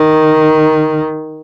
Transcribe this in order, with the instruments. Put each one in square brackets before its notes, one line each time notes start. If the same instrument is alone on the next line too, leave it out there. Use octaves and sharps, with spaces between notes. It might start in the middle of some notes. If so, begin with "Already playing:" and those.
Already playing: [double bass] D#3